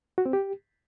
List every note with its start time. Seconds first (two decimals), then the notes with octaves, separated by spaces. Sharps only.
0.18 F#4
0.26 C4
0.33 G4